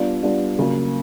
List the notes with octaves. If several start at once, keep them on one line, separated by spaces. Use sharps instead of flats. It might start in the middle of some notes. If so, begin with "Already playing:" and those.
Already playing: G3 B3 D4 F4
G3 B3 D4 F4
C#3 F#3 A#3